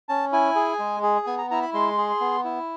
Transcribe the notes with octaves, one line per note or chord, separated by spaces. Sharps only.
C#4 A5
E4 G#5
G#4
G#3
G#4
B3 G#5
A#5
E4 A#5
B5
G#3 C6
G#4
B3
E4